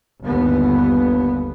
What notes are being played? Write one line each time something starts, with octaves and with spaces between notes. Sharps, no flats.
G1 D#2 B3